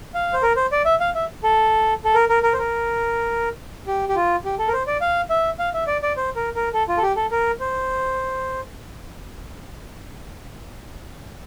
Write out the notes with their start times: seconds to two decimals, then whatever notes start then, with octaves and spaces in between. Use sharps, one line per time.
0.15 F5
0.33 C5
0.43 A#4
0.56 C5
0.72 D5
0.85 E5
1.00 F5
1.15 E5
1.43 A4
2.05 A4
2.15 A#4
2.29 A#4
2.43 A#4
2.54 C5
2.58 A#4
3.87 G4
4.09 G4
4.16 F4
4.45 G4
4.59 A4
4.68 A#4
4.73 C5
4.87 D5
5.01 F5
5.30 E5
5.59 F5
5.74 E5
5.87 D5
6.03 D5
6.17 C5
6.36 A#4
6.55 A#4
6.73 A4
6.89 F4
6.97 A4
7.03 G4
7.16 A4
7.31 A#4
7.60 C5